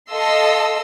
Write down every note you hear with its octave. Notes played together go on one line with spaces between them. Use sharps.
A4 D#5 F5 C6 E6